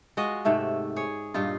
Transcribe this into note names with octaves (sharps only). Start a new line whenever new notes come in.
G#3 F4 F#4 D#5
G#2 C3 A3 E5
G#4 C#5
G2 A#2 D#4 F4